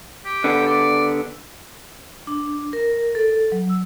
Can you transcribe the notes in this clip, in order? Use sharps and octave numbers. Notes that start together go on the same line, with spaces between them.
G4
D3 B3
D5
D4
A#4
A4
F#3
E6